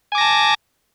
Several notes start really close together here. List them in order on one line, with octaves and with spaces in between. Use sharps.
G#5 D6 A#6 A5